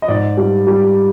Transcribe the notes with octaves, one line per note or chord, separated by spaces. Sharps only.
D#5
G#2 D5
G3
G3